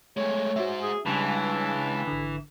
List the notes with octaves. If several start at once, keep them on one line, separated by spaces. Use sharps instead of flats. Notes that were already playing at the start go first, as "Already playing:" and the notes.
G#3 A3 C#5
G#3 F#4 C5 E5
G#4
C#2 C#3 E3 G3 D4
G#1 D3